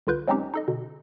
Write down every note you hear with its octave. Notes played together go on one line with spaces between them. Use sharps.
C2 D3 F4 B4 G6
F#3 G#3 C4 C#4 D#4 G4
D#4 A4 D#5
B2 D3